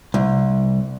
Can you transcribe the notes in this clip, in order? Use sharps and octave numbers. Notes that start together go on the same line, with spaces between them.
C2